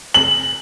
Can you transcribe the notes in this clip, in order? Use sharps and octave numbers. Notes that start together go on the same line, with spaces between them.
F#7